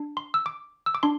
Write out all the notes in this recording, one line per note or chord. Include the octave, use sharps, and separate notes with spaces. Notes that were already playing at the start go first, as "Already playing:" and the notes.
Already playing: D4
C6
E6
D6
E6
D6
D4 C6